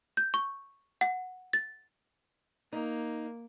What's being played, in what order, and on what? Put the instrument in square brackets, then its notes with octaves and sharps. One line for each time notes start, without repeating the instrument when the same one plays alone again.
[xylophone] G6
C#6
F#5
A6
[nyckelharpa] A#3 [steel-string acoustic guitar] D#4